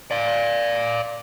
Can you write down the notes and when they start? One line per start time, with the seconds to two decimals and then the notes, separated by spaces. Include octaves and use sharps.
0.11 D5 F5